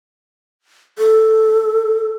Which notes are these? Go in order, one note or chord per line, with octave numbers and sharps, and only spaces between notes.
A4